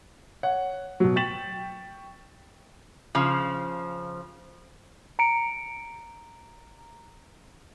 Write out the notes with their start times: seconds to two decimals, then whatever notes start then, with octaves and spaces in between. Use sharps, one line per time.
0.43 C#5 F#5
1.00 B2 F#3
1.16 G5 C#6 A6 B6 E7 F#7
3.15 C#3 F3
5.19 A#5 C#7 D7